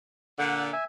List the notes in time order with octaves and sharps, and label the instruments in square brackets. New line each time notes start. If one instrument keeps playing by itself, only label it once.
[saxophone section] A#2 D3 [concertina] F#5
[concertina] E5 G#5